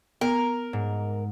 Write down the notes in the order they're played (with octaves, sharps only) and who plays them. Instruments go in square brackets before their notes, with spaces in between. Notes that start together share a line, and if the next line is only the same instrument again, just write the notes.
[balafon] B3 [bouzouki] A#4
[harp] G#2